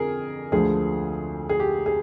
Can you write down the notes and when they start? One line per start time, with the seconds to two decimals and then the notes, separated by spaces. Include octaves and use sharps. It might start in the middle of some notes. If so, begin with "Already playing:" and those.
Already playing: F2 D3 G#4 A#4 G#5
0.52 D2 D3 F3 G#3 G#4
1.49 G#4
1.60 G4
1.86 G#4